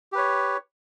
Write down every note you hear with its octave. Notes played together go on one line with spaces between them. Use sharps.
G4 B4 C#5